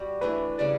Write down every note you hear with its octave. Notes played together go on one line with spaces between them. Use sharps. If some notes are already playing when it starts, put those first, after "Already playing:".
Already playing: G3 F#4
E3 A3 D4 B4
C#3 G3 C#4 D5